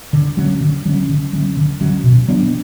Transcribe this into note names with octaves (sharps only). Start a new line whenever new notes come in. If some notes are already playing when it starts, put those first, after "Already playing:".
D3
F#3 C#4
D3
F#3 C#4
D3
F#3 C#4
D3
F#3 C#4
B2
F#3 B3 D4